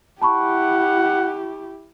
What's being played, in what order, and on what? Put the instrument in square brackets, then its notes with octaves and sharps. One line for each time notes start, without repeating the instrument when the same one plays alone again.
[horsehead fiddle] E4 G4 [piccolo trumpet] F#5 [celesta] A5 B5 C#6